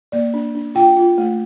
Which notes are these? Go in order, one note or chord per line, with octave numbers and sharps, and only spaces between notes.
A#3 D5
D4
D4
F4 G5
F4
A3